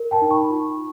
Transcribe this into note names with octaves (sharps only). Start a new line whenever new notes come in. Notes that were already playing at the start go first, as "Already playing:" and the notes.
Already playing: A#4
G5 A5
D#4
B5 C#6
F4